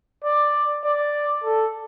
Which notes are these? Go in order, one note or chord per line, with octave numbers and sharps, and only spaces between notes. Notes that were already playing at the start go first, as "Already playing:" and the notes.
D5
D5
A4